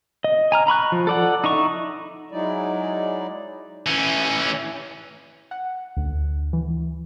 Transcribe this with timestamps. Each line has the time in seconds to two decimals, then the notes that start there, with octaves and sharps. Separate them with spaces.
0.24 D#5
0.52 G#5 A#5 F6
0.67 A#5 B5 C#6 F#6
0.92 F3
1.07 A4 D5 F#5
1.44 D#4 E4 A#5 C#6
2.32 F#3 G#3 D#4 E4 D5
3.86 E3 C#4
5.51 F#5
5.97 D2
6.53 E3